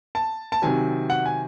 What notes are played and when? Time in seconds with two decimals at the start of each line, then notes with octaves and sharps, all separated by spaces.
0.15 A5
0.52 A5
0.62 C3 D#3 F#3 G#5
1.10 F#5
1.26 G#5